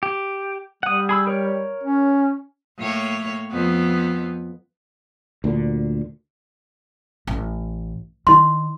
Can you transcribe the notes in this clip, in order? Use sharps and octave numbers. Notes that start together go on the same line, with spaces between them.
G4
G3 F#5 D#6
G#4 B5 E6
A#4 C#5
C#4
A2 A#3 C#5
F2 B3
D2 A#2 D3
A1
D#3 E4 C6